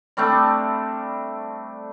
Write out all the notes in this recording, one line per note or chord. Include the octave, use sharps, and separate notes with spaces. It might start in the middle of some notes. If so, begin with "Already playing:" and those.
G3 A3 C4 D4